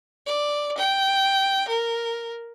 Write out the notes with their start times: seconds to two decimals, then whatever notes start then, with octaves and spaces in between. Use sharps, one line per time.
0.27 D5
0.78 G5
1.68 A#4